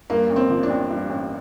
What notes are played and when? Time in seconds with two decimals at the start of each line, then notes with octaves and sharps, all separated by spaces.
0.10 G2 A#3
0.30 A1
0.36 C4
0.50 F3
0.63 D4
0.70 A1
0.90 G2
1.10 A1